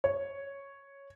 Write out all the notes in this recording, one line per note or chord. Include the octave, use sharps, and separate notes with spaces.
C#5